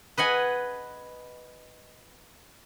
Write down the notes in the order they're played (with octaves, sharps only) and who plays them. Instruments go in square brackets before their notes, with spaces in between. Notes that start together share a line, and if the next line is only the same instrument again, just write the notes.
[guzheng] B4 D#5 F#5 G#5